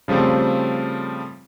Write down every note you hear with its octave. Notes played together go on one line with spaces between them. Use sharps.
C#3 F3 G3 A3 C4